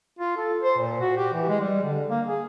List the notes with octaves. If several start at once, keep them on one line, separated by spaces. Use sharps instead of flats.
F4
A4
C5
A#2
F#4
G4
E3
G#3
G3
D3
A#3
G#4